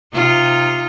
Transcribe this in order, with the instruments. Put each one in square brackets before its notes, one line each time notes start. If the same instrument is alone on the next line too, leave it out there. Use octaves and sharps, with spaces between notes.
[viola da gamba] C3 D#4 F4